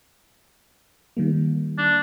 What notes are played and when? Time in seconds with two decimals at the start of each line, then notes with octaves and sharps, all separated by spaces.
1.17 D#3 G3 A#3
1.78 D4